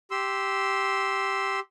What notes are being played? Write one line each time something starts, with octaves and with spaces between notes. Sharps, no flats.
G4 C6 E6